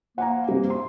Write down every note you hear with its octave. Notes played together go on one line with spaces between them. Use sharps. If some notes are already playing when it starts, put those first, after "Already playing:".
F3 A#3 F#5 G#5 A#5
G2 C3 G3
C6